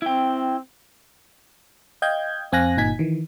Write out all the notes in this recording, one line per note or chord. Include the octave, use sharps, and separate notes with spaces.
C4 E4 G5
D#5 F5 G5 G6 G#6
F2 C4 F5 G#5 F#6 A#6
G1 A#2 D#4 G#5 G#6 B6
D#3 E3